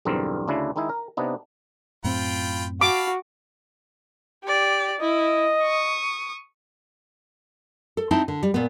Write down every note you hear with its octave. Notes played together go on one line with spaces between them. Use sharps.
B1 E2 G2 D3 C4 A#4
D2 C#3 D4 E4
D#3 G#3 D#4 E4
A#4
C3 B3 D4 D#4
F#2 A2 C4 F4 G5 B5
F#4 F5 A5 B5 D6
G4 D5
E4 D#5
C#6 D#6
A4
C4 D#4 E4 A5
D3
G3
A#2 B3